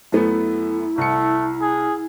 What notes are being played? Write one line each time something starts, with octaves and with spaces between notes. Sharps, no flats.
F#2 A3 B3 E4
C2 A3 C#7
G#4